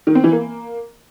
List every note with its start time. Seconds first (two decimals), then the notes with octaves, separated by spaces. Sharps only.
0.07 D#3
0.15 C4
0.24 E3
0.32 A#3